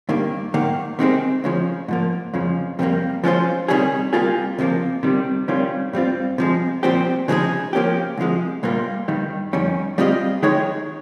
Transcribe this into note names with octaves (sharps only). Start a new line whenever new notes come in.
G2 D#3 A#3
G#2 D#3 A#3
C3 D#3 G#3 C4
C#2 C#3 F3
G#2 F3 A#3
F2 C#3 F3
F2 C3 D#3 G3 A#3
F3 G#3 C#4 F4 C5
C3 D#3 G3 C#4 G#4
C3 G3 A#3 F4 G#4
C#2 C3 F3 A#3
C3 D#3 G3
C3 D#3 G3 C#4 F4
G2 G3 C4 F4
C3 F3 G#3
C2 A#2 F3 C4 G4
C#3 F3 G#3 D#4 G#4
F3 A#3 C#4 G4
C2 C3 F3 G#3
C2 A#2 G3 A#3 F4
G2 D#3 G3
F2 D#3 G3 C#4
G3 C4 F4 G#4 D#5
D#3 G#3 D#4 G#4 C#5